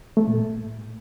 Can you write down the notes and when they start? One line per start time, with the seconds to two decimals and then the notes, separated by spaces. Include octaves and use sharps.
0.17 A3
0.27 A#2
0.37 A2